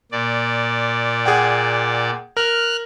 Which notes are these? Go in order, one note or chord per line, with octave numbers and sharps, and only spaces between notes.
A#2 D5
G#4 F#5 G5
A#4 F6 F#6